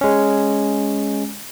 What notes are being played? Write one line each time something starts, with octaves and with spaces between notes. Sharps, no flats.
G#3 C#4